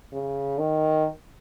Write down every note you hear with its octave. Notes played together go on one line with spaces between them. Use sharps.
C#3
D#3